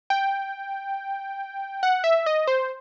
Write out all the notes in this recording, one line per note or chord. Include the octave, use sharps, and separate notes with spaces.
G5
F#5
E5
D#5
C5